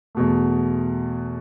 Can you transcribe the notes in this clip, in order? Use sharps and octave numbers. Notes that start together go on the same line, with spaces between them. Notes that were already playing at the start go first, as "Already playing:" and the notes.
E2 B2 A3